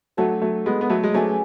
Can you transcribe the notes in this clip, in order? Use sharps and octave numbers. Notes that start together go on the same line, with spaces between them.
F#3 A3 D4 F#4 A4 C#5
F#3 A3
G#3 B3
B3
F#3 A3
G#3
F#3 A3 C#4 G#4 B4 D5